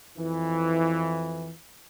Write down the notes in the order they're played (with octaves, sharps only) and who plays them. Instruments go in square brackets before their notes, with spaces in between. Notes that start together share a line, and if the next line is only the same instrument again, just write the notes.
[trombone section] F2 E3